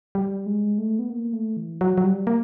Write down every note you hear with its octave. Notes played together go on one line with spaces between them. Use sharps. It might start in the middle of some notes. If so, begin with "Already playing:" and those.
G3
G#3
A3
B3
A#3
A3
E3
F#3
F#3
G3
A#3